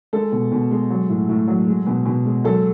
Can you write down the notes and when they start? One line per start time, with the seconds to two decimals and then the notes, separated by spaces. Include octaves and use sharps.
0.13 G#3 A4
0.32 B2
0.52 B2
0.71 G#3
0.90 F#3
1.09 A2
1.29 A2
1.48 F#3
1.67 G#3
1.87 B2
2.06 B2
2.25 G#3
2.44 F#3 A4